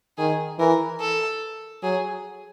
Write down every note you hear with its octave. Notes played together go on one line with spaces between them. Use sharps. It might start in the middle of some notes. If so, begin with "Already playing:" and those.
D#3 G#4
E3 A#4
A4
F#3 G#4